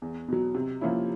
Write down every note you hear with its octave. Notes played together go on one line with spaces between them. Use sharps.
E2
B2 F#3
C3
F3 A#3 C#4 E4